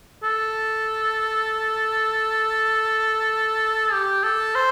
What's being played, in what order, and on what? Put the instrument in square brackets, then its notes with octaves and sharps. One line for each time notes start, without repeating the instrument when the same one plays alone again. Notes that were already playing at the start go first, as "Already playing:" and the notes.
[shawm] A4
G4
A4
C5